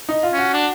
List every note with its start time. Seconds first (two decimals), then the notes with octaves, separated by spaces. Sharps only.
0.09 D#4
0.23 F4
0.33 C#4
0.38 F#4
0.53 D4